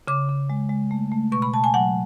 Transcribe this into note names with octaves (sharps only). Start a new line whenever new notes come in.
C#3 D6
C#3
G#3
G#3
A3
A3
B2 C#6
B5
B2 A5
G#5
F#3 F#5